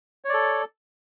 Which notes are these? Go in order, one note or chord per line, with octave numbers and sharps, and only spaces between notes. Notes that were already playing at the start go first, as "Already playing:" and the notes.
A4 C#5 D5